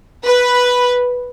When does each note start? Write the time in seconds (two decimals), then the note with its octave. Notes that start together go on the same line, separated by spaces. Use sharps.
0.25 B4